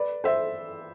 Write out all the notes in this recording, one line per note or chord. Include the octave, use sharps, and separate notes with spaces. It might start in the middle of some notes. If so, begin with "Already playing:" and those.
Already playing: B4 D5
C5 E5